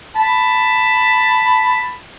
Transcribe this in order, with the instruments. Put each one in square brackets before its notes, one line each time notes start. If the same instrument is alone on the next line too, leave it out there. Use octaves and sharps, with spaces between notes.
[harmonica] A5 B5